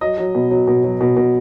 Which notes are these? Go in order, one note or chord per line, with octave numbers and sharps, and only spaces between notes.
F#3 D#5
F#3
B2
F#3
B2
F#3
B2
B2